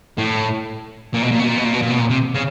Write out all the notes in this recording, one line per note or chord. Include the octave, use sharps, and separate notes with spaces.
A2
A#2
B2
A#2
B2
A#2
B2
A#2
B2
A#2
B2
A#2
C3
C#3